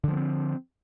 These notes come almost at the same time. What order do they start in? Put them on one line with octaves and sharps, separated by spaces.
D3 F3 B3 C4